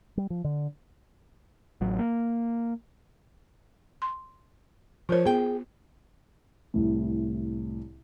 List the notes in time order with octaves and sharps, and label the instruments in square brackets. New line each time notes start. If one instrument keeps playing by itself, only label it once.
[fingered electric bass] G3
F3
D3
[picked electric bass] A1 F#3
A#3
[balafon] C6
[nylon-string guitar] F3 C#5 [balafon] F4 A#4 C5
[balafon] B3 [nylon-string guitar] G#4 G5
[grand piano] C2 A2